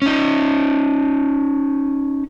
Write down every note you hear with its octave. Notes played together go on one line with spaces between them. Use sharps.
C#4 D#4